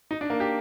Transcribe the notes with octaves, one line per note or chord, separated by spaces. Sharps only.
D#4
D4
A#3
G4